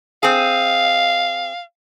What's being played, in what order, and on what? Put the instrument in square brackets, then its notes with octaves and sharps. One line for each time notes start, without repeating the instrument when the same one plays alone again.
[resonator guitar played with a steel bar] C4 G#4 [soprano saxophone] F5